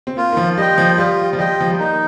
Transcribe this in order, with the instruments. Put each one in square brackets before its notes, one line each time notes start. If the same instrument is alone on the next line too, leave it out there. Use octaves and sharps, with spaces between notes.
[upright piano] C4
[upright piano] A#3 [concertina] F4
[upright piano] D#3
F3
[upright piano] G3 [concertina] D#5 G5
[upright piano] F3
[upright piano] G3 [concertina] F4
[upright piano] F3
[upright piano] G3 [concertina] D#5 G5
[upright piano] F3
G3
[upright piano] A#3 [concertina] D#4